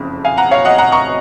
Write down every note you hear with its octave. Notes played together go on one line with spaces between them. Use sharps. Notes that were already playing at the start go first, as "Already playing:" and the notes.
Already playing: F#1 F2 C#3
F5 G#5
F#5 A#5
C#5 F5
D#5 F#5
F#5 A#5
A#5 C#6